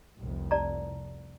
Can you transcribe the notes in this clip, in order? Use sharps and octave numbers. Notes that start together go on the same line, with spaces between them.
F1 C2
D5 A5 A#5